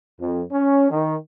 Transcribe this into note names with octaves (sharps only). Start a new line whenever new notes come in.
F2
C#4
D#3